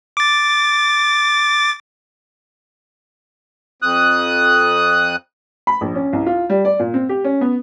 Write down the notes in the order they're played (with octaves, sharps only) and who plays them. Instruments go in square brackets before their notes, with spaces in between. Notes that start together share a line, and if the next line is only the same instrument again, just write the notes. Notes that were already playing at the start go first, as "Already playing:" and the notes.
[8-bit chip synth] D6 A6
[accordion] F2 D#6 F#6
[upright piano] B5
A#1
C#4
C2
F4
G3
D5
A#2
C4
G4
C#4
B3